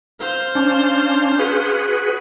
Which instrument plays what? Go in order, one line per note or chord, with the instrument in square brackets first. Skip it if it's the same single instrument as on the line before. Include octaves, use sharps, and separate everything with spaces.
[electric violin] C5 F5
[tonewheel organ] C#4 D4
F#4 G#4 B4